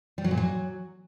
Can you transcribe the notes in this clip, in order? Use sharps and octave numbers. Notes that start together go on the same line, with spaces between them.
G3
F#3
A#2
F#3